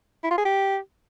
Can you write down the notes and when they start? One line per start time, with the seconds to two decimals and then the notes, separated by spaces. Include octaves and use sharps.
0.23 E4
0.30 F4
0.38 G#4
0.45 G4